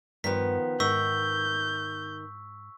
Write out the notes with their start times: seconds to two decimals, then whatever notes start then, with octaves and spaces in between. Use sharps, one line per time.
0.24 G2 D#3 F3 B3 B6
0.80 G#2 D#3 C#6 E6 G6 B6